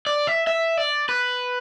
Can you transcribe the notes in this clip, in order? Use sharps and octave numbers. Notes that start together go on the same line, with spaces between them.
D5
E5
E5
D5
B4